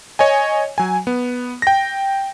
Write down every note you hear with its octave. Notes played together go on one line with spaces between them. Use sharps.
C#5 D#5 G#5
F#3 G#5
B3
G5 A#6